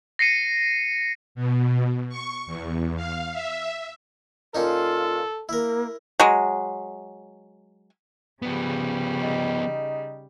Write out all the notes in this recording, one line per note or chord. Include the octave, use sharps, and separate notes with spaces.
A#6 C7 C#7 D#7
B2
C#6
E2
F5
E5
A#2 C#4 D#4 F4 A4
A#3 E4 A#4
F#3 G#3
C#3 F3 G3 B3
D#4